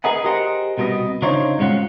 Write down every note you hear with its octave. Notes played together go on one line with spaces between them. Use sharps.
G#4 A#4 B4 D#5 F#5 G#5
G4 G#4 A#4 C5 D#5 F#5
C2 B2 B3 A#4 D#5
C#3 D4 D#4 F4 C5 C#5
G2 B2 G#3 C#4 F4 F#5